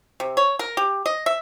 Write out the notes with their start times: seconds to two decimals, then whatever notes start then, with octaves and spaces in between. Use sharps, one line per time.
0.20 C3
0.37 C#5
0.59 A#4
0.77 G4
1.06 D#5
1.26 E5